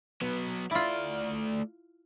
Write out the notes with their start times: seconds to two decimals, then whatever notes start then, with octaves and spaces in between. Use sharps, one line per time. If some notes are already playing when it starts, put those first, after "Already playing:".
0.22 F#3 B3
0.71 A3 E4 F4 D5